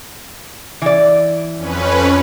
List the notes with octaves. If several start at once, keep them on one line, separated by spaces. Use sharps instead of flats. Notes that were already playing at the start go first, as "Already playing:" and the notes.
E3 D5
F2 C#4 B4